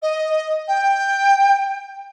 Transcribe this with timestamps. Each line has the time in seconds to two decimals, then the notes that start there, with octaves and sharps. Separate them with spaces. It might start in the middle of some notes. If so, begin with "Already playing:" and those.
0.02 D#5
0.67 G5